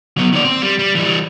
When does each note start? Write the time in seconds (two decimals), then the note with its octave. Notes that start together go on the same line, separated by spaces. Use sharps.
0.17 F#3 B3
0.33 D#3 D5
0.45 C4
0.62 G3
0.79 G3
0.95 E3 G3